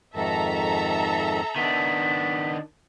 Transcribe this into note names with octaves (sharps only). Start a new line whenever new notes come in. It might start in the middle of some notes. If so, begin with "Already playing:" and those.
F2 G#2 D#3 A4 E5 A#5
D#3 B3 D4 B6